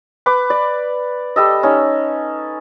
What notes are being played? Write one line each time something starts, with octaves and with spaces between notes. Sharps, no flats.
B4 D6
D5
G3 A4 D#5
C#4 D#4